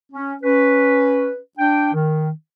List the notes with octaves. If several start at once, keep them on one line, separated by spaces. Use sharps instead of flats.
C#4
C#4 B4
D4 G5
D#3